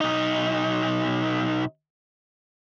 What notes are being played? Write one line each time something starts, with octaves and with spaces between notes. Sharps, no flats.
B1 D#4